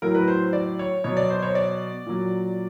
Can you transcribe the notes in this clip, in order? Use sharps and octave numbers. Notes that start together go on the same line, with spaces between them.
A2 F#3 A#4
B4
C5
D5
C#5
B2 F#3 C#5
D5
C5
C#5
D5
A#2 F#3